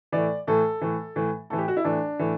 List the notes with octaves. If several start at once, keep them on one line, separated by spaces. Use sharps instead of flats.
A2 E3 D5
A2 E3 A4
A2 E3
A2 E3
A2 E3 A4
G4
F#4
E4
A2 E3 D4
A2 E3